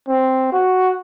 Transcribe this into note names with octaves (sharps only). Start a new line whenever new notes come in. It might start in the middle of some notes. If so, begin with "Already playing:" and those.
C4
F#4